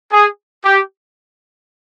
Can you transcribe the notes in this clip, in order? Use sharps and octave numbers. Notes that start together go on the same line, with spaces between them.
G#4
G4